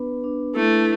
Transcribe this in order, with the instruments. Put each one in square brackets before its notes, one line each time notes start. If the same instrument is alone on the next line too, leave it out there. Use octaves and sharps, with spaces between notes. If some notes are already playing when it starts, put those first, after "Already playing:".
Already playing: [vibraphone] B3 D4 B4
D4
[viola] A3 [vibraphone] E4